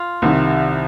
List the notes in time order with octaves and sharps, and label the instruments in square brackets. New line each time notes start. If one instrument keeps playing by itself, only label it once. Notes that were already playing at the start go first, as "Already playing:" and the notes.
Already playing: [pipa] F4
[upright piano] C2 C3 D#3